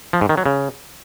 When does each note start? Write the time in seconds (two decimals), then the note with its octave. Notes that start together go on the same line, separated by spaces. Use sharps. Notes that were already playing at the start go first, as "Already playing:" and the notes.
0.13 F3
0.21 G#2
0.29 D#3
0.37 F#3
0.46 C#3